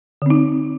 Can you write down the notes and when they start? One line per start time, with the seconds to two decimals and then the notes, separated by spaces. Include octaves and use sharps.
0.22 D3
0.26 C4
0.30 D#4